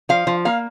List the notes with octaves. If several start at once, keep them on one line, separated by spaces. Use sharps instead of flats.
F3 F5
F3
A#3 F5